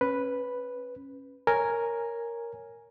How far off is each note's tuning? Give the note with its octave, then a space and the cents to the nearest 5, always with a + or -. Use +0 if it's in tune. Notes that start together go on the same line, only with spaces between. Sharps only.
C#4 -15 B4 +0
A#4 +0 C#5 +0 G#5 +0